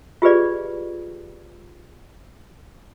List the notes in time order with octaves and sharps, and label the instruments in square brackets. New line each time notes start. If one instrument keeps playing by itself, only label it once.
[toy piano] F4 G4 G#4 B4 D5